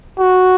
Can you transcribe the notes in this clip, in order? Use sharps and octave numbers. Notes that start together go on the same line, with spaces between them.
F#4